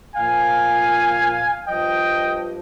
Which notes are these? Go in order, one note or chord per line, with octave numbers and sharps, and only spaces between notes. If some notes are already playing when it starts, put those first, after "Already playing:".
A#2 F3 F5 G#5
G2 F3 D#5 G5